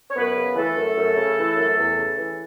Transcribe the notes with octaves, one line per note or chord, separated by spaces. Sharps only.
C#5
F#2 B3 B4
C#3
E3 A3 A4
F#2
F#2
C#3
E3
F#2
E2
C#3
E3